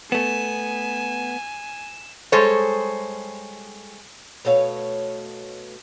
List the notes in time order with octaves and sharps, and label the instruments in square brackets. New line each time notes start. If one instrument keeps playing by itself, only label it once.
[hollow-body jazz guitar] A3 B3 [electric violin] G#5 [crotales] E7
[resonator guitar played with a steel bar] G3 G#3 A4 C5 C#5
[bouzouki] B2 A3 C#5 F5